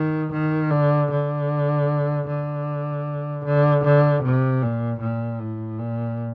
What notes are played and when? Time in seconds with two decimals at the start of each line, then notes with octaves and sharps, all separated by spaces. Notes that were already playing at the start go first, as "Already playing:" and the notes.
Already playing: D#3
0.33 D#3
0.71 D3
1.11 D3
2.28 D3
3.45 D3
3.85 D3
4.23 C3
4.63 A#2
5.01 A#2
5.40 A2
5.79 A#2